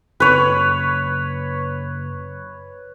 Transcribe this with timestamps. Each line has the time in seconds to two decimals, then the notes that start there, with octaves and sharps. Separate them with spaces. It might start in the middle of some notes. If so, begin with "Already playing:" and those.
0.20 F#1 B4 C#5